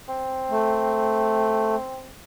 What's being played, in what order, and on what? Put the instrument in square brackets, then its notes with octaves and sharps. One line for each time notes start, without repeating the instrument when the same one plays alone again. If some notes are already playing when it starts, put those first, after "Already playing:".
[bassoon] C4
[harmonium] A3